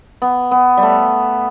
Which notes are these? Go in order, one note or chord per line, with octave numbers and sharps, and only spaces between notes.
B3
B3
G3
A3